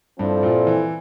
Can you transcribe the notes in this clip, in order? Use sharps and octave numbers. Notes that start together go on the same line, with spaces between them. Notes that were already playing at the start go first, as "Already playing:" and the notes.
G2 F3 C4 E4 A4 D5
A#2
E3